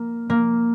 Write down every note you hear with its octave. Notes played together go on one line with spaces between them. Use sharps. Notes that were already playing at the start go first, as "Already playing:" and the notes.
Already playing: A#3
A#3